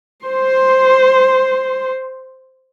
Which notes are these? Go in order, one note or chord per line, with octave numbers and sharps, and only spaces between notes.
C5 C6